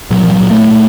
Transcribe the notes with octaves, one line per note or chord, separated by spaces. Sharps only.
A#2 F#3
F3
F#3
A#2
A3
A#2